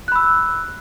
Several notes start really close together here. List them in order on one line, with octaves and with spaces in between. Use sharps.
F#6 B5 E6